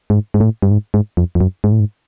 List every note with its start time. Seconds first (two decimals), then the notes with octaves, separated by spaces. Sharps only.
0.10 G#2
0.34 G#2
0.40 A2
0.62 G2
0.71 G#2
0.94 G#2
1.17 F2
1.35 F2
1.41 F#2
1.64 G#2
1.72 A2
1.80 G#2